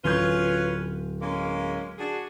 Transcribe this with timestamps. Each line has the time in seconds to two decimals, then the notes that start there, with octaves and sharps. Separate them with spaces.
0.04 D1 C#4 F4 B4 G6
1.20 G#3 A#3 C#4
1.98 D4 F#4 G#4